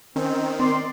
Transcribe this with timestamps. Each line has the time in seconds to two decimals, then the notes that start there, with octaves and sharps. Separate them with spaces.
0.16 D#3 C4 C#4
0.60 C4 D5 C6